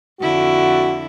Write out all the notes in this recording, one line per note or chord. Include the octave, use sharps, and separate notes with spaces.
F2 D3 E4 F#4